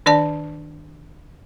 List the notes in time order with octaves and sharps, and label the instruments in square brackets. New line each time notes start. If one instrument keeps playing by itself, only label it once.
[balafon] D#3 D4 D5 A5